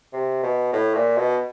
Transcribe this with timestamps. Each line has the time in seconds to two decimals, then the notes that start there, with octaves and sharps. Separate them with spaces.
0.13 C3
0.43 B2
0.73 A2
0.95 A#2
1.17 B2